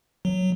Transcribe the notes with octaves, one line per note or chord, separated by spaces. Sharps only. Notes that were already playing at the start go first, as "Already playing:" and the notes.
F#3